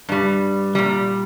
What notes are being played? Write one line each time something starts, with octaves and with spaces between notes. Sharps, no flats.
G2 G3
A#2 G3